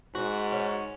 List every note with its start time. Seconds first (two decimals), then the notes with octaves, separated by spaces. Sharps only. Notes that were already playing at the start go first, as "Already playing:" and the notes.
0.15 G#2 F#4
0.52 C#4